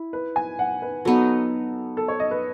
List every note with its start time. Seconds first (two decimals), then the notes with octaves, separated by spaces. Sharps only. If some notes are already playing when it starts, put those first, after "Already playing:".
Already playing: E4
0.13 B4
0.36 G#5
0.59 F#5
0.82 B4
1.05 F#3 B3 D#4 A4
1.97 A4
2.08 C#5
2.20 D#5
2.31 B4